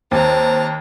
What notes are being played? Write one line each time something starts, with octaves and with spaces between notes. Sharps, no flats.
D#2 C4 A5 A#5